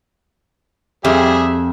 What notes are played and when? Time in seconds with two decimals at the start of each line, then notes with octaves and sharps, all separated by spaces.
1.05 F2 G3 G#4 E5